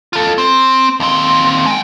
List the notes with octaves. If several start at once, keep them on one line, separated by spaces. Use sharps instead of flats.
F4 A4
C4 C5
D#2 C4
G#3 G5